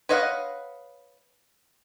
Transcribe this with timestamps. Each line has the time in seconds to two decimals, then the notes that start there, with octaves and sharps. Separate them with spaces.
0.09 B4 C#5 D#5 F5 F#5